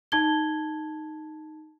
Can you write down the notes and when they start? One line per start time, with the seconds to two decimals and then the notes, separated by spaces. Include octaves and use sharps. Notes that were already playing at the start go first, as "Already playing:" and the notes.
0.12 D#4 A5 G#6 G7